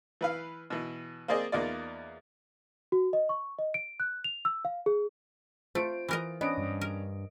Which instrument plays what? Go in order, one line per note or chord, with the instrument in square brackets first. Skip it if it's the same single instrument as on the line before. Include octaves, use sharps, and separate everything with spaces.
[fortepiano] E3 B4 F5
B2 E3
A#3 C4 G#4 D5 D#5
E2 A#3 D#4 F4 D5
[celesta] F#4
D#5
C#6
D#5
D7
F#6
F7
E6
F5
G#4
[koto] A3 [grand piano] F4 D7 [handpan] C5
[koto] E3 A#4 D#5
[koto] B3 [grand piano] C#4 D4 D7 [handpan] D#5
[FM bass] G2
[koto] A#4